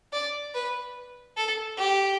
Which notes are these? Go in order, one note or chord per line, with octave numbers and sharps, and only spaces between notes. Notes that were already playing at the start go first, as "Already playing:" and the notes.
D5
B4
A4
G4